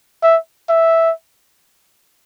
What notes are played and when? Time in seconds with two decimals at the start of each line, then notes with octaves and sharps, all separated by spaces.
0.23 E5
0.69 E5